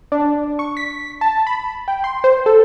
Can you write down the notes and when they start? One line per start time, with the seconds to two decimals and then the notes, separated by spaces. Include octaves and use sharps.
0.12 D4
0.59 C#6
0.77 B6
1.21 A5
1.47 B5
1.88 G5
2.04 C6
2.24 C5
2.46 A4